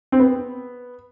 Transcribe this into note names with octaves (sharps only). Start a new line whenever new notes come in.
C4
B3